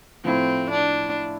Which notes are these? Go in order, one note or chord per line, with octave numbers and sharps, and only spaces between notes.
A2 F3 A3 C4 E4
D4